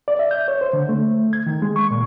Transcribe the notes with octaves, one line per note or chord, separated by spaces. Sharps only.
D5
E5
G6
C#5
C5
D3
A3
G#6
D#3
G#3
C#6
A#2